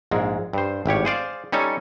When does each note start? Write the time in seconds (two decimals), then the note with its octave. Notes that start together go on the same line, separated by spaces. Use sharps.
0.11 A#1 G#2 G#3
0.53 G2 C5
0.86 G#1 A2 G4 C#5
1.05 G#4 C5 D5 F5
1.52 G3 C#4 D#4 A4 C#5